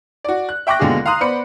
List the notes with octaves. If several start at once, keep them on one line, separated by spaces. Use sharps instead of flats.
F#4 D5
F#6
E5 G5 C#6 D6 F#6 A#6
D#2 B2 D3 G#3 F4 G#4
F5 A#5 C6 D#6 F#6
B3 C5 D5 B5 C#7